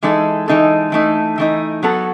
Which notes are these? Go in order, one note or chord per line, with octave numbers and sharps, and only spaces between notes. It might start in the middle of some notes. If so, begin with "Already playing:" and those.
E3 G#3 D#4 A4
E3 G#3 D#4 A4
E3 A3 D#4
E3 A3 D#4
F#3 B3 F#4 A4